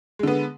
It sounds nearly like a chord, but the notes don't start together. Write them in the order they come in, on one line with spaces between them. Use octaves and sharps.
G#3 D3 B3